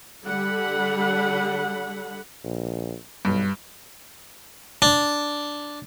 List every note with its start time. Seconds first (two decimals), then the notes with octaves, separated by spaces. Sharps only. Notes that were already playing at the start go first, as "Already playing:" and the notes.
0.25 D3 G3 A4 F#5 B5
2.44 A#1
3.25 B1 G2
4.82 D4